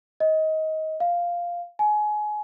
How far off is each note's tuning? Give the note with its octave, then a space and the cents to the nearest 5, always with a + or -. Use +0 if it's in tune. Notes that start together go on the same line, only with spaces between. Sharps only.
D#5 +20
F5 -5
G#5 +25